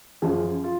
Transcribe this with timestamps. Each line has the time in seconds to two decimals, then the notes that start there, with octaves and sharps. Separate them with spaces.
0.22 F#2 F3 G#4
0.64 F4